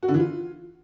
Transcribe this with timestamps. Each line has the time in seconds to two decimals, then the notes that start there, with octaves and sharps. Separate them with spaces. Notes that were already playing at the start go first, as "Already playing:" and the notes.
0.03 F#4
0.08 D3
0.14 E3
0.20 F4